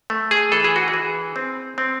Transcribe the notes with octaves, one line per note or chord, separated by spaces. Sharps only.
A3
G#4
E3 A4
G#4
F#4
G#4
E3
C4
C4